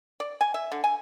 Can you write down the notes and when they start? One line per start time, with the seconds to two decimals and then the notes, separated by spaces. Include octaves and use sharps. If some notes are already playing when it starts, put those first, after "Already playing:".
0.20 D5
0.41 G#5
0.54 E5
0.72 D3
0.84 G#5